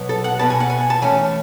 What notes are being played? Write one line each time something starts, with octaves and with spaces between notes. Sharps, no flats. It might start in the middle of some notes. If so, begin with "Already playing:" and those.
Already playing: B2 F#3 B3
A4
F#5
B2 G#3 B3 A5
G#5
F#5
G#5
A5
E3 A3 C#4 G#5